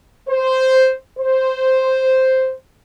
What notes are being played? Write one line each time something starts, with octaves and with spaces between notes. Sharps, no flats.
C5
C5